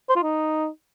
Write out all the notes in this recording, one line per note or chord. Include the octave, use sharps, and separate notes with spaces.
C5
F4
D#4